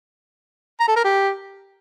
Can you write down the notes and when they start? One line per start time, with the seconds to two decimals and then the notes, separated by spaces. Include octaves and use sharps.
0.80 A#5
0.88 A4
0.96 A#4
1.04 G4